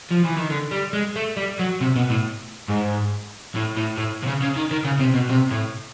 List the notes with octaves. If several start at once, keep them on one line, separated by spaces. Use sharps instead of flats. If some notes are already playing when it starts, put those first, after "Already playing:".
F3
E3
D#3
D3
G3
G#3
A3
G3
F#3
C3
B2
A2
G#2
A2
A2
A2
C3
C#3
C#3
D#3
D#3
C#3
C3
B2
C3
A2